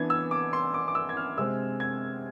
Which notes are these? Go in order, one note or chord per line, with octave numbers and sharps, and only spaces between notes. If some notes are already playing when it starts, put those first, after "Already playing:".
Already playing: E3 B3 D4 G#6
E6
D6
C6
D6
D6
E6
G#6
F6
C3 G#3 C4 E6
G#6